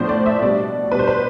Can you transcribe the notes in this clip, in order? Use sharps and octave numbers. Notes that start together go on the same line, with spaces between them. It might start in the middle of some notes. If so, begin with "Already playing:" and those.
Already playing: A2 F3 B3 D4 C5
D5
E5
B2 G3 B3 D4 D5
B2 G3 D4 B4
C5
B4